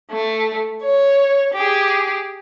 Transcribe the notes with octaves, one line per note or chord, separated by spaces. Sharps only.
A3
C#5
G4 G#4